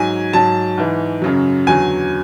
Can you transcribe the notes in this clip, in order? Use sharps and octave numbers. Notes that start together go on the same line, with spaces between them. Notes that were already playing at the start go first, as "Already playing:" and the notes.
Already playing: G#2 F#3 G#5
G#2 F#3 A5
G#2 E3
F#2 C#3 F#3
E2 D3 F#3 G#5